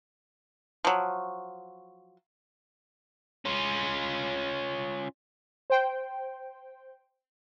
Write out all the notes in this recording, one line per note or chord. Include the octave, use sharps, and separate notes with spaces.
F3 F#3
C#4 F4
C5 G5